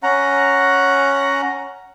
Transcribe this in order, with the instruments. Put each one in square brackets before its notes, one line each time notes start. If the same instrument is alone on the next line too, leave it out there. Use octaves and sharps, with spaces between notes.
[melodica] C#4 F#5 A#5